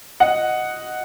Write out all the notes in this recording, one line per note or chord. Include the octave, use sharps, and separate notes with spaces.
D#5 F#5